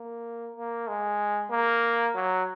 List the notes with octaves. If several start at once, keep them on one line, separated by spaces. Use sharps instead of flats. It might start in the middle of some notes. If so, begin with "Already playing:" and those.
Already playing: A#3
A#3
G#3
A#3
F#3